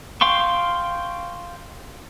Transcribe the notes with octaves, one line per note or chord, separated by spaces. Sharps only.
F5 G5 C6 C#6